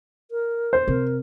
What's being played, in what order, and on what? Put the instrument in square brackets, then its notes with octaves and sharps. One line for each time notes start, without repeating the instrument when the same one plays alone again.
[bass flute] A#4
[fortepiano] C5
[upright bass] C3 [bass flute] A#4